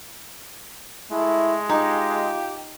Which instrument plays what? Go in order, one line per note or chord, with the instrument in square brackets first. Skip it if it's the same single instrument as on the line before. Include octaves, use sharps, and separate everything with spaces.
[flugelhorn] G#3 [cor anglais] A3 [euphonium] E4
[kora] D#4 [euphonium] F4 [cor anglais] G4